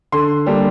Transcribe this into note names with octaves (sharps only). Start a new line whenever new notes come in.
D3 C6
G3 A#3 D4